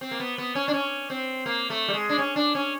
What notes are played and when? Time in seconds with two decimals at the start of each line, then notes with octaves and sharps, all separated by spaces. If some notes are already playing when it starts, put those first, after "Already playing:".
0.01 C4
0.11 A#3
0.20 B3
0.38 B3
0.55 C#4
0.68 D4
0.73 C#4
1.10 C4
1.46 A#3
1.70 A3
1.88 G3
1.94 G#3
2.09 D4
2.18 C#4
2.36 D4
2.55 C#4